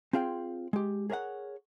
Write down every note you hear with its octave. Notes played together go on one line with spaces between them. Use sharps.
C4 F4 G#4 F5 G5
G#3 G4
G#4 A#4 C#5 E5 F#5